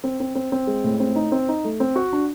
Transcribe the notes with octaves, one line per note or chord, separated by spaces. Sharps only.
C4
C4
C4
C4
G#3
A2
C4
D#4
C4
D#4
A3
C4
F#4
D4